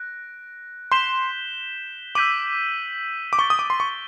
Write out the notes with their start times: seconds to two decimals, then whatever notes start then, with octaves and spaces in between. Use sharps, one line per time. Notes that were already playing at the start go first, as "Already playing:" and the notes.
Already playing: F#6 A#6 D7
0.92 C6 G6 B6 E7 G7
2.15 D6 E6 G6 B6 D#7 F#7
3.33 D6
3.39 C#6 E6 A6 D7 G7
3.50 D#6
3.59 D6
3.70 C6
3.80 C#6